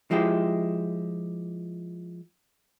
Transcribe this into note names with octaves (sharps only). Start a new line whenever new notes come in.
F3 G#3 E4 G4